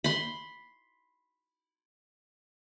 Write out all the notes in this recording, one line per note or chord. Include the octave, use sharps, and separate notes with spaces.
B5 C6